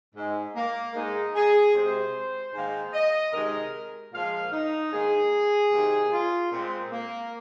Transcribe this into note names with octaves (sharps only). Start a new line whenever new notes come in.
G#2 G#3
A#3
G#2 G#3 D#4
G#4
C3 G#3 C5
G#2 D#3 A#3 C5
D#5
C3 D#3 G#3 A#4
A#2 F3 G#3 F5
D#4
G#2 D#3 A#3 G#4
C3 D#3 A#3
F4
A#2 C4
G#3
A#3